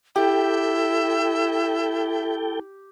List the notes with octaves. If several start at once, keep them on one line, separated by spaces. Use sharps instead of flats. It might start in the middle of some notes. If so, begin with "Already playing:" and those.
E4 G4 A4 E5 G5